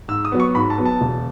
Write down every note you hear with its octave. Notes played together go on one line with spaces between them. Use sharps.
G#2 E6
D#6
F#3 B3
C#6
G#2 B5
A5
F#3 B3
A5
E1